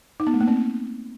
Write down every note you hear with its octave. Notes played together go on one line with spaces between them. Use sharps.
D#4
B3
A3
A#3
C4